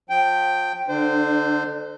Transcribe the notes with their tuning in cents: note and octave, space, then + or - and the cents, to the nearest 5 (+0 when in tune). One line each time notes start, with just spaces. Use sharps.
F3 +35 G5 +0
D3 +0 D4 +35 C5 -20